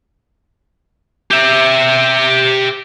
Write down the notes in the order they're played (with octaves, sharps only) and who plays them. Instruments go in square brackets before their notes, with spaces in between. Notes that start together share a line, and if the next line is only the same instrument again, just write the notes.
[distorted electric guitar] G4 E5